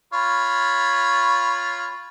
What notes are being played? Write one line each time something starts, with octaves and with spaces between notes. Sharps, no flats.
F4 C#5 B5